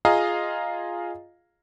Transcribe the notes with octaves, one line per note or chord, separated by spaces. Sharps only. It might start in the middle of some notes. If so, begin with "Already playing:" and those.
F4 G#4 D#5 F5 A#5